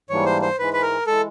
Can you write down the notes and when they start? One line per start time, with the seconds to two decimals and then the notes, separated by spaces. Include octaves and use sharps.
0.09 G#2 E3 G3 A#3 D4 C#5
0.26 C5
0.42 C5
0.58 G#2 E3 G#3 B4
0.73 B4
0.82 A#4
1.07 E3 G#3 A4